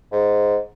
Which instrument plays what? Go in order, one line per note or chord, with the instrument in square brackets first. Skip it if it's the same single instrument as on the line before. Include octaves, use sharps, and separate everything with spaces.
[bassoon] G#2